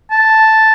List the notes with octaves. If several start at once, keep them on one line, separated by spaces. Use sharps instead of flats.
A5